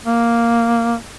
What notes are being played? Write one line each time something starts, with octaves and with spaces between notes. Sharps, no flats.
A#3